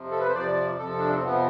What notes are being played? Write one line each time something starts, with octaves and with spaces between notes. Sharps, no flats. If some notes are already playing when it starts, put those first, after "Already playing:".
Already playing: F2 C3 F3
A4
B4
C5
F2 C3 F3 D5
F2 C3 F3 A4
D4
C4
F2 C3 F3 B3